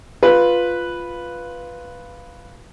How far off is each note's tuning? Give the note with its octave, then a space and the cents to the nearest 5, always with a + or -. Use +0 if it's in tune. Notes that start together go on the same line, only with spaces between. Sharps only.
F4 +0 B4 +0